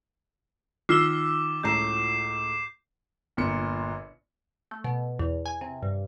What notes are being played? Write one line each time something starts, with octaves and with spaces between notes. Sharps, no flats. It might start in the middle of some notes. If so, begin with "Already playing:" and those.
D#3 F4 D6 E6 G7
C#2 A2 A#5 G6 C7 E7
G1 A#2 C#7
A3
B2
E2
G#5
C3
G2